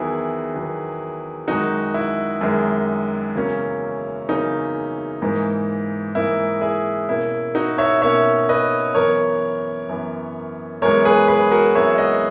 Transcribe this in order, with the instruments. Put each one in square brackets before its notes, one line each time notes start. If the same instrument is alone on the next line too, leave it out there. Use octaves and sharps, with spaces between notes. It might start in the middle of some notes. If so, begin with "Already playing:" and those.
Already playing: [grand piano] E2 D#3 F#3 B3 E4 G#4
E2 D#3 F#3 B3
F#2 D#3 G#3 D#4 F#4
E4
F#2 D#3 G#3
E2 C#3 F#3 A#3 C#4
E2 C#3 F#3 A#3 C#4 D#4
G#2 E3 A#3
G#2 E3 A#3 E4
E4 G#4
B2 A#3 C#4 E4
D#4 F#4
C#5 E5
B2 A#3 C#4 C#5 E5
B4 D#5
F#2 E3 B3 A#4 C#5
F#2 E3 B3
F#2 E3 G#3 B3 A#4 C#5
G#4 B4
G#4 B4
F#4 A#4
F#2 E3 G#3 B3 C#5 E5
E5
D#5 F#5